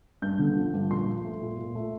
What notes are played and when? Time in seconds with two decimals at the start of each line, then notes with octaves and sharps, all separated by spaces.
0.22 G2 G6
0.39 D3
0.56 F3
0.74 G2
0.90 A#2 C6
1.08 F3
1.24 A3
1.42 A#2
1.59 A#2
1.75 A3